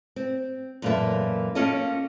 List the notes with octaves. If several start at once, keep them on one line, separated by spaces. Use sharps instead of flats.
C4
F#2 A#2 E3 A#3 A4 E5
A#3 C#4 F4 A4 C#5 D#5